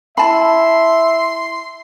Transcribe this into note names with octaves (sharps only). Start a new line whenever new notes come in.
E4 E5 A5 B5 C6